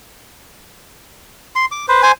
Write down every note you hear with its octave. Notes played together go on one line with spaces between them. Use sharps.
C6
D6
B4 C5
C5 G#5